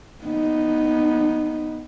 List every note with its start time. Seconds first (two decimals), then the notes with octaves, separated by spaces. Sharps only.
0.24 B3 D#4